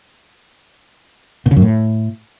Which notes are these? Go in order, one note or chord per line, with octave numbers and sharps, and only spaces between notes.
B2
C#3
F#2
A2